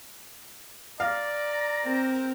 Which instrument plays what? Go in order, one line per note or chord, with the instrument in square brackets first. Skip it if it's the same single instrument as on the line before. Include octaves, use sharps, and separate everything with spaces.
[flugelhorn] D5 [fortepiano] F5 [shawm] A#5
[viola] C4 A#4